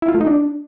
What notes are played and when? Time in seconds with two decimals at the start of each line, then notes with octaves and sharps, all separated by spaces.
0.02 E4
0.08 F4
0.15 A3
0.21 D#4
0.27 D4